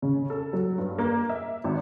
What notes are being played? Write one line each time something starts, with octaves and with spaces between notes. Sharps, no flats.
C#3
A4
F#3
G2
A#3
E5
G#1